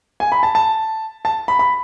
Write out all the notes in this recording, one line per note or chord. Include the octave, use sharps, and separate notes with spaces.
G#5
B5
A5
A5
A5
B5
B5